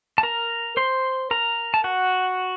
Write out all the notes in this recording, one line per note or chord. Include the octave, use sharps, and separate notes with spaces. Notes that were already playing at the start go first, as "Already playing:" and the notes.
A5
A#4 A#5
C5 C6
A#4 A#5
A5
F#4 F#5